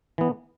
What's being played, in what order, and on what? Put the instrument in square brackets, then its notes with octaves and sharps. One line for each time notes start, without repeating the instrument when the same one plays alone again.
[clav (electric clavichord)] E3 B3